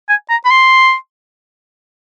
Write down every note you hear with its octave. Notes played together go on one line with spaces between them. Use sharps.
G#5
A#5
B5
C6